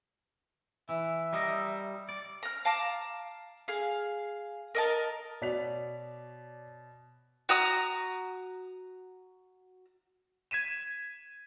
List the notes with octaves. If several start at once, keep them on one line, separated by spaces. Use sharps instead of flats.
E3 E5
G3 A#4 D#5
D5
A#5 F6
F5 A5 A#5 D6
G#4 F5
A#4 D#5 A5
B2 C#5 D5 B6 F7
F#4 A#5 D#6
G#6 B6 D#7 E7